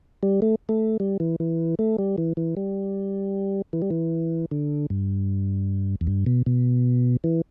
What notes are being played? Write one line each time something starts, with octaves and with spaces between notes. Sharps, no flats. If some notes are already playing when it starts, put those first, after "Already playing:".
G3
A3
A3
G3
E3
E3
A3
G3
E3
E3
G3
E3
G3
E3
D3
G2
E2
G2
B2
B2
E3